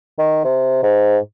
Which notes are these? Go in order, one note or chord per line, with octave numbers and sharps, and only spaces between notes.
D#3
C3
G#2